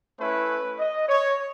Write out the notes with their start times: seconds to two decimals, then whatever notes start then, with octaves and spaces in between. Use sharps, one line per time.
0.18 A3 C#4 E4 B4
0.78 D#5
1.08 C#5